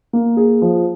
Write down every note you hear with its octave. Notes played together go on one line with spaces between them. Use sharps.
A#3
G#4
F3